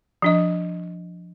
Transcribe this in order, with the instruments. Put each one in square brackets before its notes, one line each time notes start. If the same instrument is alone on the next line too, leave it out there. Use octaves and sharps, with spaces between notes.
[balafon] F3 D4 D#5